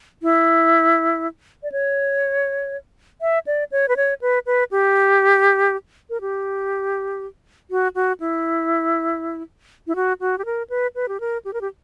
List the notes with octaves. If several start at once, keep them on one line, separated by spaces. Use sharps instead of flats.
E4
D5
C#5
E5
D5
C#5
B4
C#5
B4
B4
G4
A#4
G4
F#4
F#4
E4
E4
F#4
F#4
G4
A#4
B4
B4
G4
A#4
G4
A#4
G4